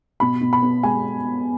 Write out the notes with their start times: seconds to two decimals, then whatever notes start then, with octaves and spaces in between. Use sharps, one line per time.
0.20 B2 B5
0.41 B2
0.53 B5
0.62 B3
0.83 G#3 G#5